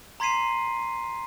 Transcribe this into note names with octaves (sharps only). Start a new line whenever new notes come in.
A#5 C6 G#6 B6 C7 D#7